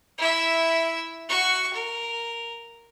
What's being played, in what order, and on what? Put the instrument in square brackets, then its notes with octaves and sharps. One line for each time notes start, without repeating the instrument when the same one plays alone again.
[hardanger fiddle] E4 E5
F#4 C#6
A#4